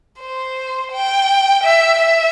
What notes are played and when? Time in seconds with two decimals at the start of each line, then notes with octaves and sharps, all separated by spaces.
0.20 C5
0.92 G5
1.63 E5
1.99 E5